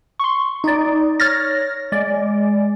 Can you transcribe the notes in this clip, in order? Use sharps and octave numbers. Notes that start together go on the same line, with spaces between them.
C6 C#6
D#4 D5
C#5 F6 A6 A#6
G#3 D5